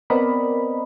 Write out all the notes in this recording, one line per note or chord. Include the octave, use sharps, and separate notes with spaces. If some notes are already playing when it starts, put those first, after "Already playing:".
B3 C4 A#4 D5 D#5 B5